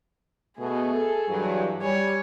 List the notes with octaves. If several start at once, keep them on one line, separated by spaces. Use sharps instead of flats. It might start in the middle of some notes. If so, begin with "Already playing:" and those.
B2 A3 G#4
A4
G2 E3 F#3
G3 C#5 G#5